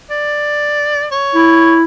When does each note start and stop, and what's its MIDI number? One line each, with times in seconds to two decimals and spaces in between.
0.10 1.05 74
1.12 1.76 73
1.35 1.85 64